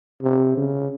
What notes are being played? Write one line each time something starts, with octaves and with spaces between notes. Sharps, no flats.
C3
C#3